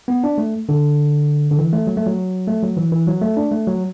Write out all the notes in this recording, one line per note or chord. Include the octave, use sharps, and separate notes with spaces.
B3
D4
A3
D3
D3
E3
A3
F#3
A3
F#3
A3
F#3
E3
E3
F#3
A3
D4
A3
F#3